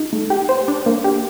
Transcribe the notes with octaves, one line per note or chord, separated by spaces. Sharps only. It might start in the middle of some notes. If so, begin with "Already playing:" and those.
Already playing: D#4
A3
G4
C5
D4
A#3
G4